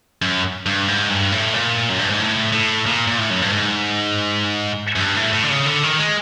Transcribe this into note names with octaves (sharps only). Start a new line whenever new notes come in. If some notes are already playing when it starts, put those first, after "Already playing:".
F#2
G2
G#2
G2
A2
A#2
F#2
G2
G#2
A2
A2
A#2
A#2
A2
F#2
G2
G#2
F#2
G2
A2
A2
D3
C#3
D3
D#3
G#3